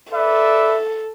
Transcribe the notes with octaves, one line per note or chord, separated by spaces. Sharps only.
A4 B4 D5 E5